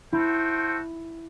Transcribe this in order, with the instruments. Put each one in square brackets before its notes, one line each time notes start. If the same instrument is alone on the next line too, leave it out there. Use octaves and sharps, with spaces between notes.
[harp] E4 [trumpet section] F#4 A4 C5 G5